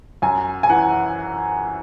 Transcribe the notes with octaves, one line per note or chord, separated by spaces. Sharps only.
F#2 G#5
G#5
E3 F#5